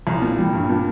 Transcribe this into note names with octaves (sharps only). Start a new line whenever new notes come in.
C2
A#2
G3
G2
A#2